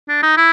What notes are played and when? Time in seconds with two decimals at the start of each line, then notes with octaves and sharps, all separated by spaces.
0.08 D4
0.23 D#4
0.37 E4